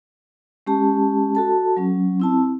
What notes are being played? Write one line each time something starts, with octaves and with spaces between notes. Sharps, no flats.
G#3 C#4 G4 A5
F#4 A4 A5
F#3 C#4
C4 E4 A5